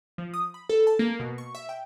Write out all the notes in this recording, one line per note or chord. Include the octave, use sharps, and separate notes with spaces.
F3
D#6
B5
A4
A5
A#3
B2
C#6
E5
G5